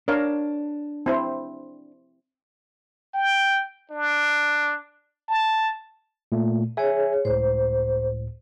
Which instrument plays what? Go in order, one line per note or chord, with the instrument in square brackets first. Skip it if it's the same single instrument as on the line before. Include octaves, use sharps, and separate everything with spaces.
[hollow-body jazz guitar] D4 [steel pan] A#4 C#5 F5
[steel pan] C4 E4 C5
[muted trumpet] G5
D4
A5
[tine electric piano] A#2 A3
[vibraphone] G#4 C#5 [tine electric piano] E5 G#5
[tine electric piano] C#2 A2 [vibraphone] C5